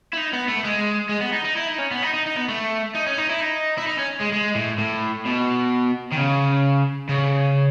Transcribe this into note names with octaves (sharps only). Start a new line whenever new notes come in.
E4
D#4
B3
A3
G#3
G#3
B3
D#4
D#4
E4
D#4
C#4
B3
D#4
D#4
D#4
B3
A3
D#4
C#4
D#4
E4
D#4
E4
D#4
C#4
G#3
G#3
A2
A2
B2
D#3
C#3
C#3